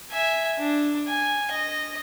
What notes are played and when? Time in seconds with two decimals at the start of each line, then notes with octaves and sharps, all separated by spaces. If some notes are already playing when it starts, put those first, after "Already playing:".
0.11 E5 G#5
0.59 D4
1.08 G#5
1.51 D#5